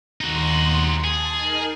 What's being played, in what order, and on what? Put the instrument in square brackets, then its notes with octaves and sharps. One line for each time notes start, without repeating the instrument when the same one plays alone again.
[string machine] D#2 C6 [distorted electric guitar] D#4 F#4
[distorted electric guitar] G#4 [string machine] A5
[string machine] D#4 A#4